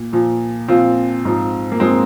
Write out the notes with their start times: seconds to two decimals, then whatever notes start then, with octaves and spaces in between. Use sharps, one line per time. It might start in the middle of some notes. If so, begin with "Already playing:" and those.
Already playing: A#2
0.13 A#2 F3
0.68 A#2 F3 C4 F4
1.25 G#2 F3
1.72 A#3
1.80 G#2 F3 G#3 C4